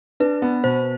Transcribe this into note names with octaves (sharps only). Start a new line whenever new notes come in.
D4 B4
B3
B2 C5